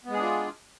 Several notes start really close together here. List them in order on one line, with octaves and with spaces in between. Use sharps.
B3 G#3 G#4 D4 F4